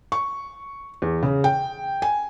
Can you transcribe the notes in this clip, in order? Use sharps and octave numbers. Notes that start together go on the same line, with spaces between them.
C#6
E2
C#3
G5
G#5